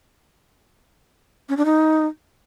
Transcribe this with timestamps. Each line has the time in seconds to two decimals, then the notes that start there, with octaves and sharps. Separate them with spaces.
1.49 C#4
1.57 D4
1.65 D#4